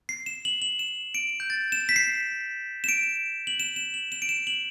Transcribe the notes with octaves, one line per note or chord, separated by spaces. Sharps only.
C7
E7
F#7
F#7
E7
D7
G6
A6
E7
B6
C7
E7
D7
F#7
E7
E7
F#7
E7
D7
E7
F#7